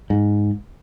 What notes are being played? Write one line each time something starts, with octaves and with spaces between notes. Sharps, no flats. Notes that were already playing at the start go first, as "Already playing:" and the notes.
G#2